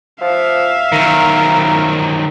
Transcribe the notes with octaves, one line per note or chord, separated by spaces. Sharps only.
F3 E5 F5
D#3 F#3 A#4